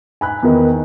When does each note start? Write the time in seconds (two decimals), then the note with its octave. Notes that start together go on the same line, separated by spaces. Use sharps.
0.21 G#5 B5 F#6
0.43 E2 D#3